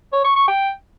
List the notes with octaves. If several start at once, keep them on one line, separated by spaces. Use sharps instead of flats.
C#5
C#6
C#6
G5